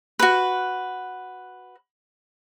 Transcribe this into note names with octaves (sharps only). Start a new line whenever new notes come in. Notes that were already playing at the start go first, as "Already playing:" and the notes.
F#4 B4